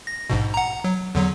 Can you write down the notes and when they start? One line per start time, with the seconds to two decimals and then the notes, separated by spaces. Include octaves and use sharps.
0.07 A#6
0.30 A#1 G#2 B2
0.54 F#5 A#5
0.84 F#3
1.15 E2 D3 F#3